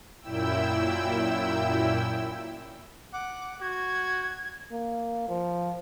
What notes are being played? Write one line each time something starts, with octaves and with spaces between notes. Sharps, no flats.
F#2 A#2 E4 G5 E6
F#5 D6
F#4 G#6
A#3
F3